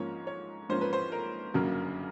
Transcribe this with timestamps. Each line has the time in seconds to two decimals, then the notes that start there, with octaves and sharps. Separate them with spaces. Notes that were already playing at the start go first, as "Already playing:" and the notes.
Already playing: G#2 F3 A#3 C#4 C#5
0.27 C#5
0.69 G#2 F3 A#3 C#4 C5
0.81 B4
0.93 C5
1.12 A#4
1.54 G1 F#2 C#3 F#3 A#3